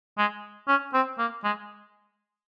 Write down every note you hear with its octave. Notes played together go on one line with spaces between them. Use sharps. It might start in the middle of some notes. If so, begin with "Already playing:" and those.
G#3
C#4
C4
A#3
G#3